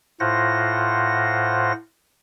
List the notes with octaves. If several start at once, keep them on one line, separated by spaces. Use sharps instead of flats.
A2 F4 C5 F#5 A#6